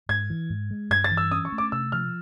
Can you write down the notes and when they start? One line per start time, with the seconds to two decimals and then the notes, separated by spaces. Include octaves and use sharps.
0.09 G#2 G#6
0.30 E3
0.50 G#2
0.71 G#3
0.90 G2 G#6
1.04 A6
1.11 E3
1.17 E6
1.31 C#4 D#6
1.45 C#6
1.52 A3
1.58 D6
1.72 C3 E6
1.92 F3 F6